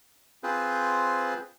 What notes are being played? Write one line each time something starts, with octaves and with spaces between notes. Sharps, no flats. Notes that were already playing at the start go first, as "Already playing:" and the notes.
C4 F4 G#4 B4 C5